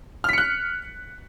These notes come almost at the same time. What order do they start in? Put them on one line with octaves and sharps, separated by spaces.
F6 B6 C#7 F#6